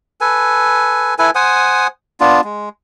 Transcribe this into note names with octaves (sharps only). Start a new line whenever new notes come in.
A4 B4 G#5
E4 A4 B4 G#5
C5 F#5 G#5 D#6
B3 D4 F4
G#3